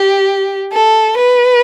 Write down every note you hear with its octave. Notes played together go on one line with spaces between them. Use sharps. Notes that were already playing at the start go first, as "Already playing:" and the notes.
Already playing: G4
A4
B4